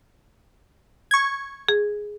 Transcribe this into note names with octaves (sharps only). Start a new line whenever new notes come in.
C#6 G#6
G#4